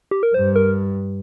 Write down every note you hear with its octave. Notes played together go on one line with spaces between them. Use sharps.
G4
A#4
G2 C5
A#4